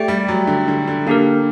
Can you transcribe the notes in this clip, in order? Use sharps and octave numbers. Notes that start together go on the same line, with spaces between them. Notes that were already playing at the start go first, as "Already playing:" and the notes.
Already playing: A3 G4 D5 G5
G3
F#3
D3
D3
D3
D3 A#3 D4 G4 A#4